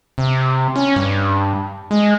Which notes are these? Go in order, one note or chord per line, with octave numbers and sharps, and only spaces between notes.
C3
C#4
G2
G#3